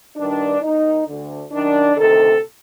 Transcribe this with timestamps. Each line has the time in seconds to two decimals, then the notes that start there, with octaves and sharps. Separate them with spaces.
0.17 G2 D#3 D4
0.62 D#2 D#3 D#4
1.07 D2 D3
1.52 F#2 D#3 D4
1.97 D2 C3 D#3 A4